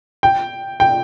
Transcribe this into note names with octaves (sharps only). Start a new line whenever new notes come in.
G5
G5